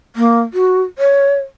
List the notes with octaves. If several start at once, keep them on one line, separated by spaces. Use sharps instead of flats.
A#3
F#4
C#5